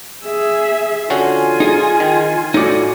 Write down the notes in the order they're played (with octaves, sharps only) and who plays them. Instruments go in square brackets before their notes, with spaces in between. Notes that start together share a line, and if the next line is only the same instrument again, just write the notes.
[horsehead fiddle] G#4 E5
[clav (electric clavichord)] D3 C#4 F#4 [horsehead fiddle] F4 G#5
[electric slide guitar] D#4 G#4
[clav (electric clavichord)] D#3
[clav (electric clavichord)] A2 D5 [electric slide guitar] D#4 F#4